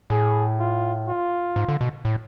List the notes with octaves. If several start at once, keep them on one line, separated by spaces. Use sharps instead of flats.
A2 G#4
F4
F4
G#2
D3
B2
A2